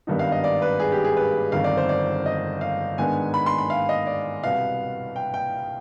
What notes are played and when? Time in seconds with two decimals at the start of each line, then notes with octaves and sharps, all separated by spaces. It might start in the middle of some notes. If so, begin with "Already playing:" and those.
0.07 G#1 G2 D#3 B3 D#4
0.19 F5
0.32 D#5
0.44 D5
0.62 B4
0.80 G#4
0.92 G4
1.04 G#4
1.17 B4
1.52 G1 F2 D#3 F5
1.64 D5
1.77 C5
1.89 D5
2.26 D#5
2.61 F5
2.98 G#2 D#3 B3 D4 G#5
3.34 B5
3.46 C6
3.58 B5
3.70 F5
3.89 D#5
4.07 D5
4.43 C2 B2 B3 F5
5.16 G5
5.34 G5